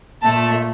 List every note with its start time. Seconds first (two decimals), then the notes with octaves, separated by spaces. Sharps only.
0.21 A#2 A3 A5